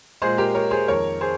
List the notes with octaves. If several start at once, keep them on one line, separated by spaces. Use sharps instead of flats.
A#2 G#3 G#4 C5
G4 A#4
A#4 C#5
G#4 C5
F2 D#3 A#3 A#4 C#5
G#4 C5